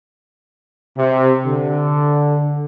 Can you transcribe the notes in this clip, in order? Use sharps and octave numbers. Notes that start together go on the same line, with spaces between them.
C3
D3